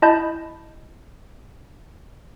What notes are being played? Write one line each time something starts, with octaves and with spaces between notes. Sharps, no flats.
E4 D#5 A5 B5 G6